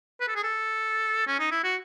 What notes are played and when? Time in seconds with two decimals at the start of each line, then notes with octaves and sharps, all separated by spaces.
0.20 B4
0.28 A4
0.35 G#4
0.43 A4
1.27 C#4
1.39 D#4
1.51 E4
1.63 F#4